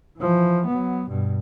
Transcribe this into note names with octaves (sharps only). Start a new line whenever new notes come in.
E3 F3
F#3 B3
G2 B2